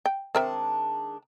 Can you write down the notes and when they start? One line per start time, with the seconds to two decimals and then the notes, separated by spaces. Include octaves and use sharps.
0.06 G5
0.35 D#3 G#3 C4 D4 A#4 E5